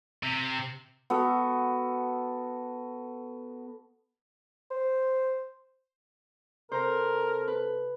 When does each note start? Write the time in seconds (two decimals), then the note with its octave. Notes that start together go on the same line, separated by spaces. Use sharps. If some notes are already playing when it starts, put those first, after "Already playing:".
0.23 C3
1.10 B3 F#4 A4
4.71 C5
6.72 C3 A4 A#4 C5 A#5
7.48 B4